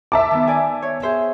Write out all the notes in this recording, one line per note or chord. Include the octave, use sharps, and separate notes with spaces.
E5 A5 D6
D#3 B3
D5 G#5
C#5
G#4 C5 E5